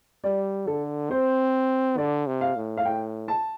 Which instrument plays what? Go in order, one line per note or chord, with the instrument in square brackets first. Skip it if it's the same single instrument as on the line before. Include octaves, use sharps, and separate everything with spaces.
[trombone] G3 [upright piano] D5
[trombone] D3 [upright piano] A4
[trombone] C4 [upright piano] C5
[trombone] D3 [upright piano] D5
[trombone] C3
[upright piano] F5
[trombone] A2
[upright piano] F5
[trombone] A2 [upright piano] G5
[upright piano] A5